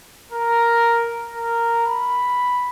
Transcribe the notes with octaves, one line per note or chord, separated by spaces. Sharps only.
A#4
A#4
B5